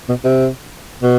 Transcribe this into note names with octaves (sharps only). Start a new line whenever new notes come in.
B2
C3
B2